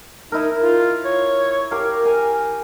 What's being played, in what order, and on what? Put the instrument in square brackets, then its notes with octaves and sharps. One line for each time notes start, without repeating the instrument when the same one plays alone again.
[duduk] D#4 [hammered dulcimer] E4 A#4
[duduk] F4
C#5
[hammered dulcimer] G4 A#4 F5
[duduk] A#4 [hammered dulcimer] G#5